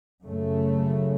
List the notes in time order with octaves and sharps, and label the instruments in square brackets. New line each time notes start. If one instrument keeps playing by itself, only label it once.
[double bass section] F#2 C#3 A3